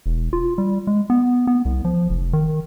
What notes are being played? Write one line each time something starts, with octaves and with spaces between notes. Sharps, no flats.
E1
F4
G3
G#3
B3
B3
C2
F3
F1
D#3